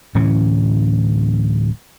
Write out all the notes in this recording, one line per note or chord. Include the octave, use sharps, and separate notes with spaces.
D1 A2 E3 C#4